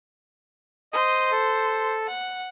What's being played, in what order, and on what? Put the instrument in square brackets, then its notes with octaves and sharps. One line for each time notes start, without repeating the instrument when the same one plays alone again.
[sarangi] C5 [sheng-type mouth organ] D#5 D#6
[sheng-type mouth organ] A4
[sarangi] F#5